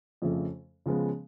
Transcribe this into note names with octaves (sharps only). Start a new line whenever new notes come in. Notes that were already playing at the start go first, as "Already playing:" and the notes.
F2 C#3 F3 A3
C#3 F3 G#3 B3